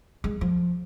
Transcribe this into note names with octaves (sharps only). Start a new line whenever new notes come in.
G#3
F3